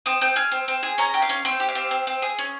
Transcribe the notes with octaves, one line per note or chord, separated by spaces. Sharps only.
C4 D#6
C4 G6
G#4 F6
C4
C4
G#4
C#4 A#5
G4
F5
C#4
C4 G5
G4
F5
C4
C4
C4
G#4
C#4